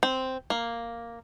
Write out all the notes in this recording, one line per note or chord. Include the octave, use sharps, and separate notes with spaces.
C4
A#3